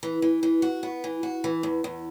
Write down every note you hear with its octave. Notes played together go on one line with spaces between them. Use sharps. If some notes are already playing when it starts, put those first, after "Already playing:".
E3
E3
E3
F#4
B3
E3
F#4
E3
E2
E2